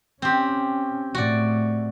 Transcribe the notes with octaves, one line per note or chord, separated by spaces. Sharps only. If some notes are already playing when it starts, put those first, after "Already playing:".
C4 C#4 G4
A2 F#4 D5